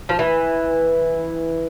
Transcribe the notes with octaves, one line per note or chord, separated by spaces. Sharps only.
F3
E3